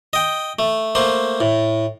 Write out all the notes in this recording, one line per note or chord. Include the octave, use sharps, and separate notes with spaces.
D#5 G5
A3
A3 A#3 C5
A2